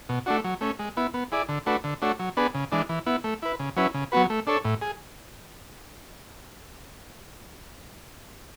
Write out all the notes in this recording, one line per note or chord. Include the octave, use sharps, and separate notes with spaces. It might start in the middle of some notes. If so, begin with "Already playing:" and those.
B2
A3 D4 F#4
F#3
A3 C#4
G#3
B3 E4
B3
E4 G#4 D5
D3
A3 D4 F#4 B4
D3
A3 D4 F#4 C#5
F#3
B3 D4 G#4 B4
C#3
E3 G#3 D4
E3
B3 E4
A3
E4 B4
C#3
F#3 C#4 E4 B4
C#3
F#3 B3 F#4 B4
A3
D4 A4 C#5
A2
G#4